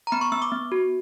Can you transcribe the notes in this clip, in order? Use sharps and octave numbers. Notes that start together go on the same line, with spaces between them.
A#5
B3 B5
C#6
B3 E6
D6
B3
F#4